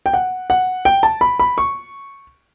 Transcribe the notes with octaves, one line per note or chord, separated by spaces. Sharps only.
G5
F#5
F#5
G5
A5
B5
B5
C#6